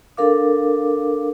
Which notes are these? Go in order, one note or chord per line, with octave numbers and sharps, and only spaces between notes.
D4 A4 A#4 F5 D6